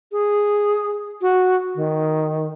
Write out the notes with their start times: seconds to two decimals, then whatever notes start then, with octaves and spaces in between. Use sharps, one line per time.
0.12 G#4
1.22 F#4
1.76 D#3